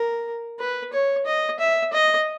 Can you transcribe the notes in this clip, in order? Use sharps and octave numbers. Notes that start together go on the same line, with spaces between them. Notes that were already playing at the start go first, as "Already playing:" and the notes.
Already playing: A#4
B4
C#5
D#5
E5
D#5